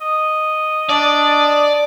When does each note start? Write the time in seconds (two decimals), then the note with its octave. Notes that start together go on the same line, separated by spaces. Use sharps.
0.01 D#5
0.89 D4 D5